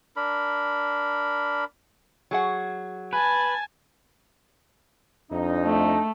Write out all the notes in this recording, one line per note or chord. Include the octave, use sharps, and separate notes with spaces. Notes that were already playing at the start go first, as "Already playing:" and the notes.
D4 A#4 B5
F#3 G#4 F#5
B4 G#5 A5
F2 D4 D#4
A3